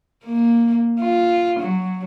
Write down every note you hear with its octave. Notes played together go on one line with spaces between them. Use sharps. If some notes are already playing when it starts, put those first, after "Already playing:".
A#3
F4
F#3